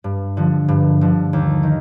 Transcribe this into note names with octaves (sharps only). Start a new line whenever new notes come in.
G2
D3 F3
G2
D3 F3
D#2
D#3